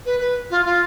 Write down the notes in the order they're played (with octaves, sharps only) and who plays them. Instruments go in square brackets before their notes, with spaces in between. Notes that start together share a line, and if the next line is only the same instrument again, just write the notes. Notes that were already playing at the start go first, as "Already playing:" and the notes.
[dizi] B4
B4
F4
F4